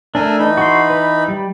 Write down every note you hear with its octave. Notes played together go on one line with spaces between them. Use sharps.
A3 D4 A#4 E5 G#5
E3 D#4 B5
F#4 C6
B4
G3